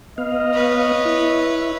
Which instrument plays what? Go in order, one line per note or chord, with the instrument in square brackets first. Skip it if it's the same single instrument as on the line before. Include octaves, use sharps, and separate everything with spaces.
[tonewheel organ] B3 F5 [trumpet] D#5
[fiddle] B4 C#5
[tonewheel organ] E4